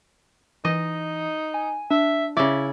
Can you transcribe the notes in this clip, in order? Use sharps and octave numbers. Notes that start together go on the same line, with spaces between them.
E3 D#4 D#5
G#5
D4 E5
C#3 E4 D5 E5